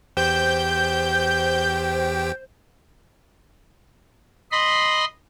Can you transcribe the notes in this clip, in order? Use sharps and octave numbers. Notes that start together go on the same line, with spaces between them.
E2 G4 C5 G5 G6
D#5 B5 C6